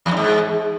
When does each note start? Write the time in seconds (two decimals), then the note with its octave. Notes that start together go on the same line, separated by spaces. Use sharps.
0.06 E2
0.11 G2
0.17 G#2